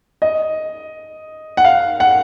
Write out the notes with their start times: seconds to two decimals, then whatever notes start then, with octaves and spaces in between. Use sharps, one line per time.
0.22 D#5
1.57 F#5
1.64 F5
2.00 F#5